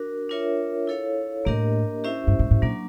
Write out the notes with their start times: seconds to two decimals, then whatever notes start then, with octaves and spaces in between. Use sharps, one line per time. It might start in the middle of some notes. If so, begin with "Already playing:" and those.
Already playing: D4 F#4 A#4
0.29 D4 F4 A#4 C#5 E5
0.87 E4 A4 C#5 F5
1.45 A2 A#3 D4 G4 A#4 D#5
2.04 C#4 E4 G4 C5 E5
2.27 G2
2.39 G#2
2.51 A2
2.62 A#2 F#3 A#3 D4